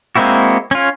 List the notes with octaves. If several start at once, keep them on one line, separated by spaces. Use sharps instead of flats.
G#3 A#3 C4 E4 F#4
C#4 F4